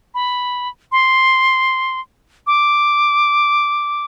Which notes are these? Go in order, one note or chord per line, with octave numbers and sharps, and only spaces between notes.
B5
C6
D6